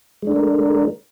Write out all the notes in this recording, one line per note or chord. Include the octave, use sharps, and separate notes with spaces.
G#3 A3 D4 A#4